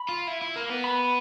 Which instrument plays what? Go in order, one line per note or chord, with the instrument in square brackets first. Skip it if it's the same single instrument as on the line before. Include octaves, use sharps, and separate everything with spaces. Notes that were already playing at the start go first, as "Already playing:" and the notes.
Already playing: [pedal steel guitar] B5
[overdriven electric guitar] F4
E4
E4
A#3
B3
[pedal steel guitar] B5